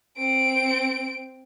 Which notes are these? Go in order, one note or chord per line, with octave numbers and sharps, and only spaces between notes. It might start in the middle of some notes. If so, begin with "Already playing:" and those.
C4 D7